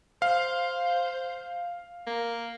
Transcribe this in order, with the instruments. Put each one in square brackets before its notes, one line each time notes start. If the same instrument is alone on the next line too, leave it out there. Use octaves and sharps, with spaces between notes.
[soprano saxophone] C5 [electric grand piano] F5
[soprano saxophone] A#3